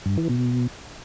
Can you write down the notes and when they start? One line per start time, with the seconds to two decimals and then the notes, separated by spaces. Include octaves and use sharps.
0.06 G2
0.18 E3
0.29 B2